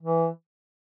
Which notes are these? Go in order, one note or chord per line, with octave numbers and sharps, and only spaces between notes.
E3